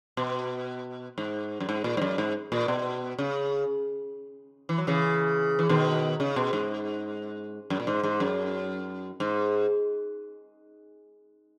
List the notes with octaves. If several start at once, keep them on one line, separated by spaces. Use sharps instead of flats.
B2
G#2
F#2
G#2
A#2
G#2
F#2
G#2
A#2
B2
C#3
E3
F#3
C#3 E3
E3
B2 D#3
C#3
B2
G#2
F#2
A#2
G#2
G#2
F#2
G#2